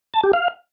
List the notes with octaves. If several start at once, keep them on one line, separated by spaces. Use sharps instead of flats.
A5
G4
F5